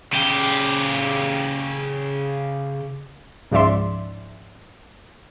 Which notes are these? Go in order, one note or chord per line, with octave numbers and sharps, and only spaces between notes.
C#3 G4
C#2 G#2 F3 D5 E5 C6